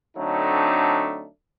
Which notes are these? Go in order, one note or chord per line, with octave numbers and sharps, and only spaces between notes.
D3 F#3 A3 C4 D4 D#4